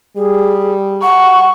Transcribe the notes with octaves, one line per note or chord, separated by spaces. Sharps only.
G3 G#4
F#5 C#6